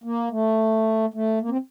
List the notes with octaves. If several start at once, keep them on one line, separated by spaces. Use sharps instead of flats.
A#3
A3
A3
A#3
C4